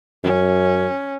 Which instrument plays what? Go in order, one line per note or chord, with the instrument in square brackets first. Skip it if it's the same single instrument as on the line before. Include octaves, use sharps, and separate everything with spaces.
[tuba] F#2 [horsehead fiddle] C#4